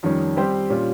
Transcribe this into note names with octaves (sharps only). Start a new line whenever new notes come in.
F2 D#3 G3 C#4
G3 C4 G4 C5
A#2 G3 C#4 F4